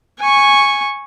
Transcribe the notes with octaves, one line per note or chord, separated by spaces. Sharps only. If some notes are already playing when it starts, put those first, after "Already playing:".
G#5 C#6